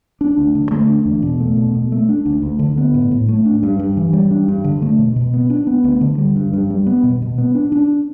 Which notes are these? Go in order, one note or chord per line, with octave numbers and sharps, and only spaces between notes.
D4
D2
D3
A3
D4
E2
B2
A3
B2
B2
A3
D4
D2
D2
D3
B3
A2
A2
A3
D4
G2
G2
E3
G3
D4
G2
D3
A3
B2
B2
B3
D4
B3
D2
D3
G3
G2
G2
G3
B3
B2
B2
B3
D4
D4